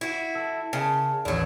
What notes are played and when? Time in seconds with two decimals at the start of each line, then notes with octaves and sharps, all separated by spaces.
0.01 E4 F#4
0.35 A4
0.73 C#3 A#4 D#5 A5
1.25 A1 D#2 F#3 D4